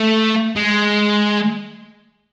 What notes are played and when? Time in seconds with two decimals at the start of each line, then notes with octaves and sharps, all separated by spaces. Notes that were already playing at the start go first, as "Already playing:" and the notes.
Already playing: A3
0.56 G#3